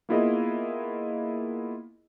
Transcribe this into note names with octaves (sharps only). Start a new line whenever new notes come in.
A#3 B3 E4 F4 G#4 D#5